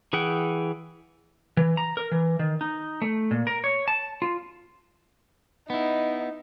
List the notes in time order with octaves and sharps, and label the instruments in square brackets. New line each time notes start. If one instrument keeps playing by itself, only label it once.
[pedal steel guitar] E3 G#4 F#5 G5
[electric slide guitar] E3
A#5
A#4
E3
D#3
D#4
A3
A#2
A#4
C#5
A5
F4
[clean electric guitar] B3 E4 [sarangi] D#4